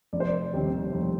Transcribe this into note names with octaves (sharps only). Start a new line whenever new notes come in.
F1 D5
C5
D5
D#2 D#3 G3 C4
F1